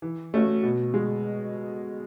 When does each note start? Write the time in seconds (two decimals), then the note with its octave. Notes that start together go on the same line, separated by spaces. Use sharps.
0.02 E3
0.34 A3 C#4 F#4
0.63 B2
0.94 G#3